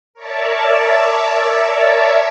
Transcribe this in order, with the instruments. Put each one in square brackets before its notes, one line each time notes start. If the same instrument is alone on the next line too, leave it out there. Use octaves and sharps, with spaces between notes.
[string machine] A#4 C#5 D5 E5 A5